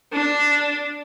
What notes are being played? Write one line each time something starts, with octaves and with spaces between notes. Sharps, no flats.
D4